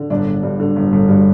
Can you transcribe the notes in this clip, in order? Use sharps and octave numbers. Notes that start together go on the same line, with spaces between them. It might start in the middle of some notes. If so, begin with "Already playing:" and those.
Already playing: D3
G1 D4 D5
G1
G2
D3
G1
G1
G2